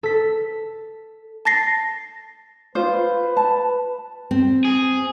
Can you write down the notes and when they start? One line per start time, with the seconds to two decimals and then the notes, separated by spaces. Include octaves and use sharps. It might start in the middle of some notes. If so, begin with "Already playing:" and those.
0.03 A4 B6
1.45 A5 A6 A#6 C7
2.75 F4 B4 C5
3.37 A5
4.31 C4
4.65 G#4